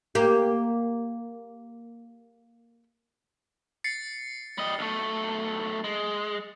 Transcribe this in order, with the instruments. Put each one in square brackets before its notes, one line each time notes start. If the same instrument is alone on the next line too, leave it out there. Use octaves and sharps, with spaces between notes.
[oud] A#3 G4
[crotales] A6 C7 C#7
[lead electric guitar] G3 D#5
B1 A3
G#3